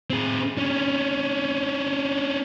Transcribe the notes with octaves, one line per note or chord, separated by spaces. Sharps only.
C4 G#4
C#4 D4